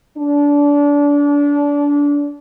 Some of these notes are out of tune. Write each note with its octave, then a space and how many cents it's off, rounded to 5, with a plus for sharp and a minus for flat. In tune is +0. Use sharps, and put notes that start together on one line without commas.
D4 -25